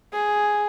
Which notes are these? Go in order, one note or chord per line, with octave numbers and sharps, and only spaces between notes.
G#4